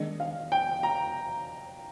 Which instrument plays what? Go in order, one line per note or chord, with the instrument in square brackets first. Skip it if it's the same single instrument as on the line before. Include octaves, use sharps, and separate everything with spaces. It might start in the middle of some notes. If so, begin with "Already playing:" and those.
Already playing: [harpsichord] D#3 G#3 D4 [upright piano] D#5
[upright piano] F5
G5
A#5